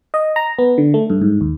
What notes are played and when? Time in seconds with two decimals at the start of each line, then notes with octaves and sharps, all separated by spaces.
0.14 D#5
0.36 A#5
0.59 B3
0.78 D3
0.94 A3
1.10 G2
1.22 G#2
1.41 D#2